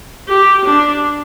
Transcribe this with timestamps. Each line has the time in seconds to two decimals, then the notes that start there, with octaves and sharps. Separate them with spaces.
0.28 G4
0.65 D4